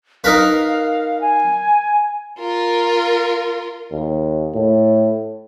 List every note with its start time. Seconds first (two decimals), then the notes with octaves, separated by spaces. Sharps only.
0.24 D#4 A#4 B4 F5
1.21 G#5
2.39 F4 A#4
3.92 D#2
4.54 A2